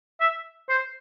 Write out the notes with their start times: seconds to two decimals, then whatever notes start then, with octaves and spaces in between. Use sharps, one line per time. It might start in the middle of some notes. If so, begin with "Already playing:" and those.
0.21 E5
0.69 C5